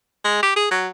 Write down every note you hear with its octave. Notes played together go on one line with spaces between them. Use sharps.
G#3
G4
G#4
F#3